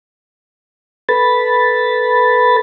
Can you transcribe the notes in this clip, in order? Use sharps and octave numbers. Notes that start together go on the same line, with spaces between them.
A4 B4 B5 A6